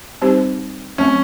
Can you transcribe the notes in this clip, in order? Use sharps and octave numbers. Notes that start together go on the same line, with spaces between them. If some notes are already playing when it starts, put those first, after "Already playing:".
G3 C4 D#4 G4 C5
F#3 A3 C4 C#4